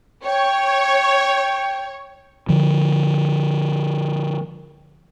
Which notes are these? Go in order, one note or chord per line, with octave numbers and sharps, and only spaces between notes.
C#5 G5
D3 F3